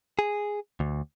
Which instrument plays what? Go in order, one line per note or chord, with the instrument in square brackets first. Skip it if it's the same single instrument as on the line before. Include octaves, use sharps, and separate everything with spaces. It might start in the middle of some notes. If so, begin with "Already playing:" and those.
[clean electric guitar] G#4
D2